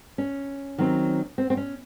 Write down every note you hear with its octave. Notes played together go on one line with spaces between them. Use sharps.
C#4
D#3 F#3 C4
C4
C4
C#4